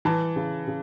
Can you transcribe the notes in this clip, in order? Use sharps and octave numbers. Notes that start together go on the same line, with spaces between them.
E3 A5
C#3
C#3